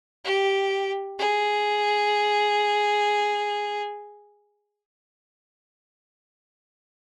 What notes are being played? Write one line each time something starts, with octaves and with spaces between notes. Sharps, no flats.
G4
G#4